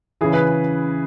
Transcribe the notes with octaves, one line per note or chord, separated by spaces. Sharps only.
C#3 E3 G#4
B4